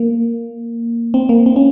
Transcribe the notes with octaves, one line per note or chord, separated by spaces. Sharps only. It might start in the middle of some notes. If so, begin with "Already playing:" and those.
Already playing: A#3
C4
A#3
C4
C#4